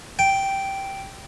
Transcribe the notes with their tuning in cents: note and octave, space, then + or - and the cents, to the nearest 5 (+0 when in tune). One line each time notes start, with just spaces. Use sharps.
G5 -5